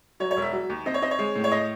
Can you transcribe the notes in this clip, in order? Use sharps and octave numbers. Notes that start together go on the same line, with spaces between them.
F#3 C#5
C#5
E1
E5
F#3
D#2
C4 D#5
C#5
C4 D#5
C#5
G#3
A2
C#5
D#5